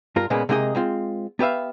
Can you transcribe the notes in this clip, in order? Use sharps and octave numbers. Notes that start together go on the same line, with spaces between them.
G2 F4 A#4
A#2 C#3 G#3 A#3 B3
C3 G#3 A#3 D#4 G#4 D#5
G#3 C4 F4
B3 G4 B4 E5 F5